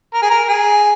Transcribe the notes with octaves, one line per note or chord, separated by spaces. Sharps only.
A#4
G#4
A#4
A#4
G#4